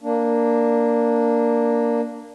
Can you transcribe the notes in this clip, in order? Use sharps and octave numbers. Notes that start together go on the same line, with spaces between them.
A#3 D4